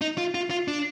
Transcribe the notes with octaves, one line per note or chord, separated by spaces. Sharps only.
D#4
F4
F4
F4
D4